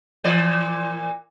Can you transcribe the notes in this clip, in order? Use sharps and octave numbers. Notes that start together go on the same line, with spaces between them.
A#2 E3 D5